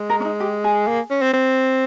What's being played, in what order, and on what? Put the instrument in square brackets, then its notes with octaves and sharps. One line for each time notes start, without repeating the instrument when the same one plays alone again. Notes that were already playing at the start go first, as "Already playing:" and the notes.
Already playing: [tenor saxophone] G#3
[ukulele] A#4
C#4
D#4
G4
G#4
[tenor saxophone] A#3
C#4
C4
C4